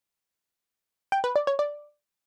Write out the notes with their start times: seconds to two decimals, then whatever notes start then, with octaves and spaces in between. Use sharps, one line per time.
1.12 G5
1.24 B4
1.36 D5
1.47 C#5
1.59 D5